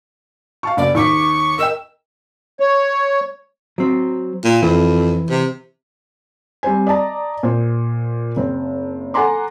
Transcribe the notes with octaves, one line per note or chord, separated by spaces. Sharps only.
F5 A5 C#6
F#1 D5
D#2 C#6 D6 B6
A#4 D#5 G5 E6
C#5
F#3 C4
A#2
F2 E3
C3
G3 C4 C5 G#5
D5 D#5 A5 A#5
A#2 C5
F#1 C4
A4 F#5 G#5 A#5 C6 D6